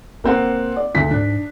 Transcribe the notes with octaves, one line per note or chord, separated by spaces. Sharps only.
E1 A#3 C4 F#5
D5
D2 C#3 B6
G#2 D4